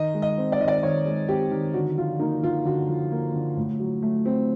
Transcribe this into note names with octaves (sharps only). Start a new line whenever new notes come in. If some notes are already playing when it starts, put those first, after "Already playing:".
Already playing: D#3 D#5
G#3
D#5
C4
D5
D#3 D#5
D5
D#3 C#5
G#3
C4 G4
D#3
D3 F#4
F3 F4
A#3 D#4
D3 F4
D3 F#4
F3
A#3
D3
A2
F#3
A3
C4